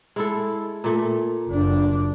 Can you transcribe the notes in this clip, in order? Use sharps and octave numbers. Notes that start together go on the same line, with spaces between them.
G#3 E4 A4
A#2 A3
F#1 D4